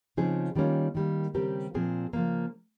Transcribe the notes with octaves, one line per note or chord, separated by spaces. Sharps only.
C#3 F3 C4 D#4 G#4
D#3 G3 A#3 C#4 F4
D#3 G3 A#3
C#3 G3 C4 G4 A#4
A#2 F3 C4 F4 G#4
C#3 F3 A#3